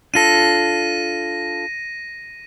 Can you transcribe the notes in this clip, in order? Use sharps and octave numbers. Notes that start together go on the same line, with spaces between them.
D4 F4 A4 A#6 D#7